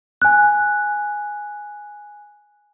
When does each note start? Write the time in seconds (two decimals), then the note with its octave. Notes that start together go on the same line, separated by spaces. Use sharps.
0.22 G#5 F#6